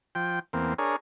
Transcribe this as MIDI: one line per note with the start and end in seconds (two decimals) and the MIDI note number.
0.15 0.39 53
0.15 0.39 79
0.53 0.74 40
0.53 0.74 58
0.53 0.74 60
0.78 0.96 62
0.78 0.96 68
0.78 0.96 70
0.78 0.96 73